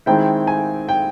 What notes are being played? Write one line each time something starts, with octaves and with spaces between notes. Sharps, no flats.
D#3 G#3 C4 E4 G5
G#5
G5